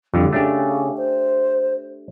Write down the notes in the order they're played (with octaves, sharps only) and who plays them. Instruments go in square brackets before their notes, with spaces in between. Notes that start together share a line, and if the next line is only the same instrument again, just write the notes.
[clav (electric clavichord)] F2 D3 [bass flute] G3
[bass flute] C#3 [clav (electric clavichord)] A3 D4 G4
[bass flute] C5